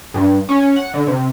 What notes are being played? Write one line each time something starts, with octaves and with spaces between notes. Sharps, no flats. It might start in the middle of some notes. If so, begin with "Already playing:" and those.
G2
C#4
F#5
D3
C3